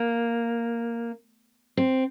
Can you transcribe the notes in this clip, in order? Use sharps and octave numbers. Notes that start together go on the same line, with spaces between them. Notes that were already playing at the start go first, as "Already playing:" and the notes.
Already playing: A#3
C4